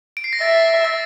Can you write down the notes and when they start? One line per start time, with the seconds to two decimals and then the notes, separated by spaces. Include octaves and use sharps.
0.17 D7
0.24 C7
0.33 A#6
0.42 E5 A6
0.84 A6